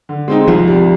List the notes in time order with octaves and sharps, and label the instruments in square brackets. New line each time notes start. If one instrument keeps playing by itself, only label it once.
[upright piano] D3
G#3 C4 D#4
[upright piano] C2 [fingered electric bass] F3
[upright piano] C3 G3